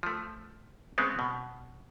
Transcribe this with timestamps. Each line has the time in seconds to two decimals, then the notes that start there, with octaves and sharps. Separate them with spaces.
0.03 F3 A3
0.98 C#3 G#3 B3 C4
1.19 B2